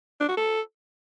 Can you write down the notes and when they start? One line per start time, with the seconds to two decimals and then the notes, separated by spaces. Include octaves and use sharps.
0.20 D4
0.29 F#4
0.37 A4